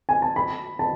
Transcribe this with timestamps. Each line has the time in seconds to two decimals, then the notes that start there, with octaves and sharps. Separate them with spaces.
0.09 G#5
0.22 A5
0.36 B5
0.79 A5